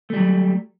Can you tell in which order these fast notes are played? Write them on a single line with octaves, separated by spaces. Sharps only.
A3 G3 F#3